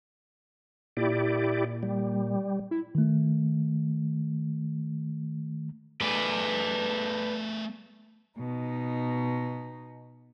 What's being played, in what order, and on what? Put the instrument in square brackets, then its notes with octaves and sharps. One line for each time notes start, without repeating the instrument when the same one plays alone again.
[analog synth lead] A#2 [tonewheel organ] E4 G4 D5
[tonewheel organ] G3
[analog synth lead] E4
[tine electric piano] D#3 A3
[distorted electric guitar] A3 G#4 [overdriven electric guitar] B4 D5
[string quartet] B2 D#4